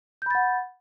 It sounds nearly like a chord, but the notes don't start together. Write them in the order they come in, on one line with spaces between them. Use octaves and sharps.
G6 B5 A6 F#5